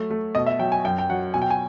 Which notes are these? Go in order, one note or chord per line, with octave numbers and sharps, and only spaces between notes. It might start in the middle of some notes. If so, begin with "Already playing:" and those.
Already playing: F#3 A3
A3
B2 D#5
E5
F#3 G5
G#5
F#2 G5
G5
F#3 F#5
B2 G#5
G5
G#5